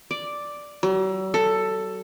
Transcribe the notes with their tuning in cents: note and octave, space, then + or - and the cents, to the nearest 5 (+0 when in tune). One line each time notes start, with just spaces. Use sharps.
D5 +0
F#3 +45
A4 +10